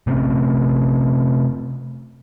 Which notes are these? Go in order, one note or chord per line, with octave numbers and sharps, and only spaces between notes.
C3 A3 C4 C#4